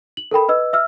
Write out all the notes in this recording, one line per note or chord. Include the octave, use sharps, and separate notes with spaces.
F#7
A4 A#4 G5 B5
B4 D#5 E6
E5 E6 F6